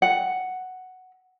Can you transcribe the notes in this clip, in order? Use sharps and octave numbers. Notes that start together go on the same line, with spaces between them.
F#5